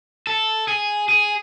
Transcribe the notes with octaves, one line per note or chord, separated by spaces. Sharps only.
A4
G#4
G#4